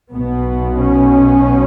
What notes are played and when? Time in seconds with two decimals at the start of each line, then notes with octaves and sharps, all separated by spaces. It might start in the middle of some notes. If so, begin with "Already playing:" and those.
0.12 B1 B2 B3
0.79 C#4